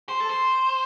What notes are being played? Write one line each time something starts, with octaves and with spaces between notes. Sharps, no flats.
C5
A4
C5